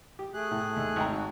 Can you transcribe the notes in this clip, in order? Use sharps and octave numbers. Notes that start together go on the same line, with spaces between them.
G4
A3 G#4 F#6
A2
D#2
G#1 G5 A#5
F#4